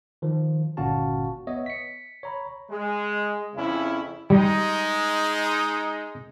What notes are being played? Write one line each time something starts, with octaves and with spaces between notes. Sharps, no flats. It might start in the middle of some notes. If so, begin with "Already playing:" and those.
D#3 F3
G1 A#2 C#4 F#4 F5 A5
B3 C#5 D#5 E5
B6 C#7
C#5 A#5 B5
G#3
F2 C#3 C#4 E4
G3 G#3 D#4